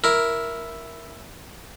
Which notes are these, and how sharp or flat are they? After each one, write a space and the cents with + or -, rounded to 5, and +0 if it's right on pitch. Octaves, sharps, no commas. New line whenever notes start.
E4 +0 A#4 +5